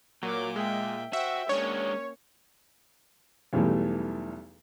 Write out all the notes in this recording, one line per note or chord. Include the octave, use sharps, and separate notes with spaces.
A#2 F#3 A#4 D6
G#3 E5 G5
F#4 C5 E5 G5
G#3 A#3 C#4 D4 C#5
B1 E2 E3 G3 A3